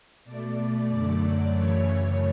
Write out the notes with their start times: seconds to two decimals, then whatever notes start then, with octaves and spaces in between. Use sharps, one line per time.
0.25 B2 A3 D5
0.89 F#2 D3 F#3 A3
1.53 F#2 C#3 E3 A3 C#5